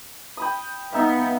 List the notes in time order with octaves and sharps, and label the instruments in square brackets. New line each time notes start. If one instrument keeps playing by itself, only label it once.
[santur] G5 B5 D#6
[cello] B3 [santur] D#4 E5 F5